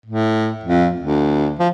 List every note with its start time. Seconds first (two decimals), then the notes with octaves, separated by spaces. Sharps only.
0.06 A2
0.63 F2
1.00 D2
1.59 F3